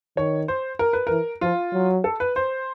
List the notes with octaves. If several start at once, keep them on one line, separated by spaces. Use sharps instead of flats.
D#3 C#5
C5
A#4
B4
E3 A#4
F3 F4
F#3
A4
B4
C5